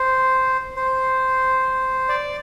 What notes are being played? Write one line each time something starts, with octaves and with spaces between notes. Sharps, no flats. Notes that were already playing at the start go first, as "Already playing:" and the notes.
Already playing: C5
C5
D5